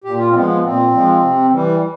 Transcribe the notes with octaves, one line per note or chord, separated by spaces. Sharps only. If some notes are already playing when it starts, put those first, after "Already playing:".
A#2 G4
F4
C4
F3 G#3 B3
B3
A#2 C4
F3 G#3
C3
E3 G3